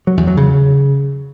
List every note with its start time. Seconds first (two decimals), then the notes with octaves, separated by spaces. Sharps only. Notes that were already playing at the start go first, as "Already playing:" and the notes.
0.07 F#3
0.17 E2
0.27 F#3
0.37 C#3